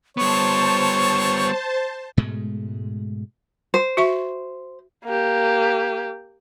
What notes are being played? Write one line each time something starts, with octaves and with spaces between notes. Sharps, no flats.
G3 B3 C5 C#5 A5 C#6
G#2 B2 G#3 A3
C5
F#4 E5 C#6
A#3 G4